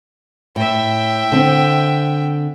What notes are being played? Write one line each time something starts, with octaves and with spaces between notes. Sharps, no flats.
A2 E5 G5
D3 C4